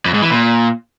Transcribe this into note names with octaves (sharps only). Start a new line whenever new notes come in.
F2
G#2
E3
A#2